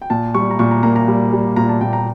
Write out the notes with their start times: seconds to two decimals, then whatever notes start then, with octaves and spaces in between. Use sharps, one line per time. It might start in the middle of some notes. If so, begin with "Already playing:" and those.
0.02 G5
0.10 A#2 A5
0.34 G3 C#6
0.51 A#5
0.59 A#2 C#6
0.71 A#5
0.83 A#3 A#5
0.96 A#5
1.08 G3
1.33 G3
1.56 A#2 A#5
1.69 A5
1.81 A#2 G5
1.93 A#5